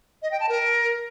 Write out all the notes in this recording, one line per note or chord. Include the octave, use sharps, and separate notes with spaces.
D#5
G5
A5
A#4